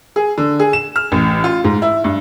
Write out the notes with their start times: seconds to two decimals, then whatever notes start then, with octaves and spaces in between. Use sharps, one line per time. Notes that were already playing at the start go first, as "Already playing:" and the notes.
0.16 G#4
0.38 D3
0.60 G#4
0.73 E7
0.96 F6
1.12 A1
1.44 F4
1.64 G#2
1.82 E4
2.04 G2